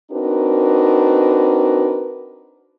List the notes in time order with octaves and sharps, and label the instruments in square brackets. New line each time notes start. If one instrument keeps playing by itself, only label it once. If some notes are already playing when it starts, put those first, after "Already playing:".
[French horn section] C4 D4 D#4 F#4 A#4 B4